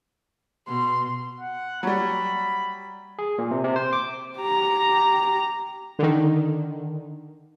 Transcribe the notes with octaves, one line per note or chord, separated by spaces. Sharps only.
B2 C6
F#5
F#3 G3 B5
G#4
A#2
C3
C3
C5
D6
G4 A#5
D3 D#3